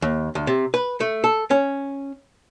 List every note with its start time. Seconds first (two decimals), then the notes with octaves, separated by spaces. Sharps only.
0.02 D#2
0.35 D2
0.47 C3
0.74 B4
1.00 A3
1.24 A4
1.51 C#4